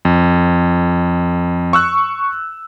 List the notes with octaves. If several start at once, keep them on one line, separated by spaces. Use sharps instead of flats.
F2
C#6 E6 F#6